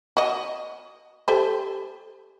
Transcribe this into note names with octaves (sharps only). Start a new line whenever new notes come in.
F#4 D#5
G4 A4 C5